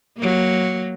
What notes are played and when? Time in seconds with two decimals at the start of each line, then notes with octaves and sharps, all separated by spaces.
0.17 F#3 A#3